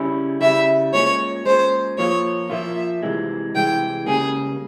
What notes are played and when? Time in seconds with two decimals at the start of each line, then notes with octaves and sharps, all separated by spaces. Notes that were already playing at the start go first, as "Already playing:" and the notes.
Already playing: C#3 G3 C#4 E4
0.41 C#3 G3 C#4 E4 E5
0.94 A#2 G#3 C#4 C#5
1.46 A#2 G#3 C#4 C5
1.98 A#2 F3 A#3 F4 C#5
2.50 A#2 F3 A#3 F4 E5
3.03 C2 C3 E3 G#3 C4
3.55 C2 C3 E3 G#3 C4 G5
4.06 C#2 C#3 G3 A#3 C#4 G#4